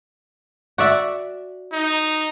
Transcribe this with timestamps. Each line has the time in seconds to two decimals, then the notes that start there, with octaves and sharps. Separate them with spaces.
0.78 F#4 D5 E5
1.72 D#4